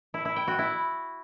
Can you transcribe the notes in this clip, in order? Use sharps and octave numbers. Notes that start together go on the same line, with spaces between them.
E4
E4
G5
F#4
E4